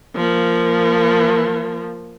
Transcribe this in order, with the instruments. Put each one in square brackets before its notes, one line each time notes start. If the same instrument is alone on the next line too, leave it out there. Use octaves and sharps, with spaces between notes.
[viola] F3 A#3